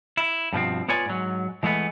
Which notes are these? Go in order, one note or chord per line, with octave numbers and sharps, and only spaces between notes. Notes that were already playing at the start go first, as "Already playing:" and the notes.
E4
G2 B2 F3 C4
B3 F4 C#5 D5 G#5
G#2 F#3
E3 G#3 A3 B3